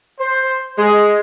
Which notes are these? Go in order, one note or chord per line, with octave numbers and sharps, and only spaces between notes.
C5
G#3